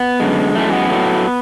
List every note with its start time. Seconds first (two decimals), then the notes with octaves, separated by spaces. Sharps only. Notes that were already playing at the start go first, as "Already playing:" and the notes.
Already playing: B3
0.20 F#2 D3 G#3
0.54 F#2 E3 G#3 A3
0.73 B3
0.90 A2 F#3 A3